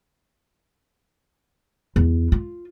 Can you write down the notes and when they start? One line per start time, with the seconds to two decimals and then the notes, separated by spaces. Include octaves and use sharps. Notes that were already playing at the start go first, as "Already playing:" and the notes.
1.96 E2
2.32 F4